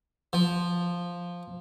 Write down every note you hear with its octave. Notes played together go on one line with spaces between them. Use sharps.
F3